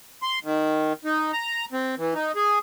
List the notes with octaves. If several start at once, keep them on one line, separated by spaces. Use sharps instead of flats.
C6
D#3
D#4
A#5
C4
E3
D#4
G#4